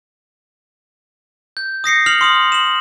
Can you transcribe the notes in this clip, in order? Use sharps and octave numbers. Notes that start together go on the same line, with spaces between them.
G6
D#6 A#6 C7 C#7
F6 C7 F7 F#7
C6 D#6 F#7
E7 F#7